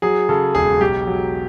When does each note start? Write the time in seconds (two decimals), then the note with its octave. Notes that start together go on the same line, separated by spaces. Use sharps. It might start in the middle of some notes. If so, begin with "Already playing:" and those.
0.02 F#3 G#4
0.29 C#3 A4
0.55 E1 G#4
0.81 B1 G4
1.07 F#3